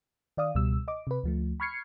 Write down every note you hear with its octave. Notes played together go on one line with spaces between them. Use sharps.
D#3 D5 F5 D#6
C#2 B2 G3 E6
D#5 D6
C3 B4
D2 F3 A3
B5 C#6 F6 G#6 C7 C#7